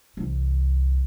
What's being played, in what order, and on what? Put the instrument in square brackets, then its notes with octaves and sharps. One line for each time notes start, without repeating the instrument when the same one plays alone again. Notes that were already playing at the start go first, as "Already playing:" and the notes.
[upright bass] C2 E3